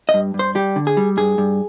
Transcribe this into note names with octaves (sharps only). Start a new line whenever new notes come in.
D#5
G2
G2
C5
G3 G4
D3
G#4
G3
G2 G#4
G2